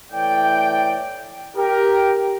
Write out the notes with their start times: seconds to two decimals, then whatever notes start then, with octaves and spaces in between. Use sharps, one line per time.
0.12 A2 E3 D5 G5
1.57 G4 A#4